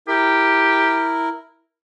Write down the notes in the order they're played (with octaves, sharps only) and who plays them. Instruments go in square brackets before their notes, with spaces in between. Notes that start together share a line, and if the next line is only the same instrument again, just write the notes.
[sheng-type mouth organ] E4 A#4 [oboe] G4